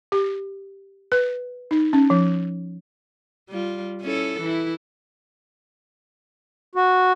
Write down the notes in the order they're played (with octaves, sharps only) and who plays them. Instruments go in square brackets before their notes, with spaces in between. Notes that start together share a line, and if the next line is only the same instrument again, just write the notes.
[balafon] G4
B4
D#4
C#4
F3
[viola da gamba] G3 F4
C#4 E4 A4
E3 E4
[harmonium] F#4